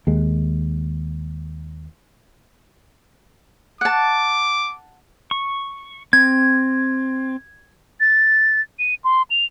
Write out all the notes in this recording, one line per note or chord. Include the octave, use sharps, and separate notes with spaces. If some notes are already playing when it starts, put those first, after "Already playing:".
D#2 G#3
F#5 A5 D6
C#6
C4 G#6
A6
D#7
C6
F7